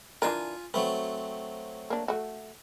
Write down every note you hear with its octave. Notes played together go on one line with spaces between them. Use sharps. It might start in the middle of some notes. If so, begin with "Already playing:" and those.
E3 D4 F4 A#4 G#5
F#3 A3 C4 B4
A#3 D4
A3 F#4